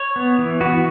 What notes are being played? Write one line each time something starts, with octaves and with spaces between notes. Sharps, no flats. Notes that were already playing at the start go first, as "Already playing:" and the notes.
Already playing: C#5
B3
E3
B3 F#4